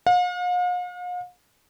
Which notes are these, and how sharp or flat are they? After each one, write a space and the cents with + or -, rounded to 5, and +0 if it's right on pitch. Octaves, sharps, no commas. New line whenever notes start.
F5 +45